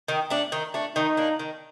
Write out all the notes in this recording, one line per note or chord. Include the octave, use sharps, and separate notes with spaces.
D#3
A3 D4
D#3
A3 D4
D#3 D#4
A#3 D4
D#3